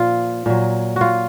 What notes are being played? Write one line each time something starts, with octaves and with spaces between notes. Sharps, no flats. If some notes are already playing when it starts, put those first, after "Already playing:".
Already playing: A#2 F3 F4
A#2 F#3
F4 F#4